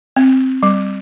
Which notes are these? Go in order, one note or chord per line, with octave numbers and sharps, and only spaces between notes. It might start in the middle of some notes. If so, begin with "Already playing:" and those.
C4
G3